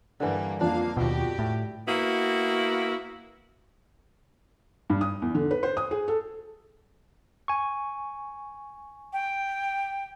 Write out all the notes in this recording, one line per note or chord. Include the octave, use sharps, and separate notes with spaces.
G2 D3 E3 G3 A#3
F2 A#3 D4 F5
D#2 B2 F#4 G4
A2
A#3 B3 E4 F#4
G2
D#6
E2
D3
B4
C5
D#6
G#4
A4
G#5 C#6
G5